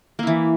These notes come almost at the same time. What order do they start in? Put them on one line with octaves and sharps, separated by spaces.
A#3 E4 E3